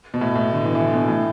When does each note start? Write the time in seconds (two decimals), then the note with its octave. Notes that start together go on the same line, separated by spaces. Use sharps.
0.14 B2
0.21 A2
0.36 A2
0.53 D3
0.65 E3
0.75 E3
0.79 D3
0.94 B2
1.08 A2